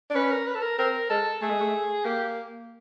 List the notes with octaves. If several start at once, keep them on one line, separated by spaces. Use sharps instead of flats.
D4
C#4 B4
A#4
B4
A4
A#4
C4 A#4
G#3 A4
A3 G#4
G#3
A3
A#3 G4